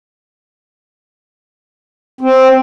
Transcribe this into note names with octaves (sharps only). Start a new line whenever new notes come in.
C4